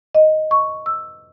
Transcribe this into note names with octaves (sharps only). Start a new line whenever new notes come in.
D#5
C#6
E6